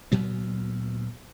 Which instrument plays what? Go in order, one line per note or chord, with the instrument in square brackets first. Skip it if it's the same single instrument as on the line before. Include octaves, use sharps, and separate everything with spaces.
[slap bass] D2 A#2 F#3 B3